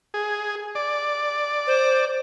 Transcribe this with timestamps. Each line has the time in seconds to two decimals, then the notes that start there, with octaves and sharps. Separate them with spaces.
0.14 G#4
0.75 D5
1.67 C5